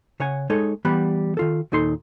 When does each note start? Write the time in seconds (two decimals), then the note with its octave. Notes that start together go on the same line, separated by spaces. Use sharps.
0.20 C#3 C#5 F#5 G#5
0.50 G#3 D#4 A4 C#5 D#5
0.85 E3 G3 B3 F#5 B5
1.37 D#3 F4 A4
1.72 D#2 A#2 D#4 A4 C6